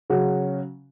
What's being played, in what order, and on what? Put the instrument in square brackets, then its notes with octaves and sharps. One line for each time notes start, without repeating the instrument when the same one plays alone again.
[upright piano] C#3 F#3 C#4 F#4